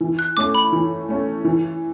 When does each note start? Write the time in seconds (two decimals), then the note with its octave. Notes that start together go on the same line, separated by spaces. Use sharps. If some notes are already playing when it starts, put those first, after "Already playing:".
0.01 E3
0.19 F#6
0.37 A3 C#4 D6
0.55 B5
0.72 E3
1.09 A3 C#4
1.45 E3